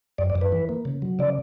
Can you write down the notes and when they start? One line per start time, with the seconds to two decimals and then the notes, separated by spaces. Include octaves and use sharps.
0.18 F#2 D5
0.30 D5
0.35 F#2
0.41 B4
0.52 E3
0.69 A#3
0.85 C#3
1.02 F#3
1.19 C#3 D5